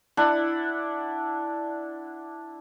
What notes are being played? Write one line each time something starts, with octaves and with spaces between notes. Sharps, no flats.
D4 E4 F#5